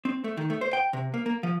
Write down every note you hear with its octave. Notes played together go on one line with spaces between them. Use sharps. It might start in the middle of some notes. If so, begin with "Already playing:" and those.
C4
A3
D#3
A3
C5
G5
C3
A#3
A#3
F3